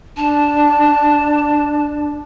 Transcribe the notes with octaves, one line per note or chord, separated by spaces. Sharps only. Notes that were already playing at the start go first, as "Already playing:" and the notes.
D4 A5